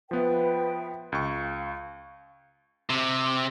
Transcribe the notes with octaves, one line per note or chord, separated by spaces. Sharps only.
F3 B3 B4 E5 G5
C#2 F5 C#6
C3